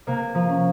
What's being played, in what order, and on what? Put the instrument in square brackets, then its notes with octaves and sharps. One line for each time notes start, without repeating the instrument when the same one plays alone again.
[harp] C3 A#3
F3
C#4